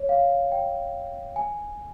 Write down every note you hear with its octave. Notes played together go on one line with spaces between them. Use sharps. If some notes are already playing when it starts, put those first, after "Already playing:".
Already playing: C#5
F5
G5
G#5